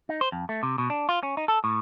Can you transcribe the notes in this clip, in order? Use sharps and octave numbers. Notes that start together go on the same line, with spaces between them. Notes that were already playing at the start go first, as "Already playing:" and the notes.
D#4
C5
F2
A3
C3
B2
D4
F4
C#4
D#4
A4
A2